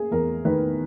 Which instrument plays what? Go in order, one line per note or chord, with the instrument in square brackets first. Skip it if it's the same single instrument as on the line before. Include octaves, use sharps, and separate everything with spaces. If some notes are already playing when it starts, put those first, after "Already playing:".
Already playing: [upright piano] A#3 C#4 G#4
E2 A#4
D#3 B4